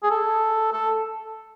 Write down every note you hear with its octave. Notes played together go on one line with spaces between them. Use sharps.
G#4
A4
A4